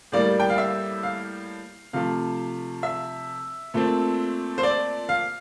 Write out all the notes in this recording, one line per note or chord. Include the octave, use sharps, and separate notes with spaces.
A2 G3 A#3 D5
G5
F5
E5
F5
C3 F3 A3 F5
E5
A#2 A3 C4
C5
D5
F5